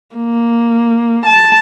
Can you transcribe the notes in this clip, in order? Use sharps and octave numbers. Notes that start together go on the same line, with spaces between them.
A#3
A5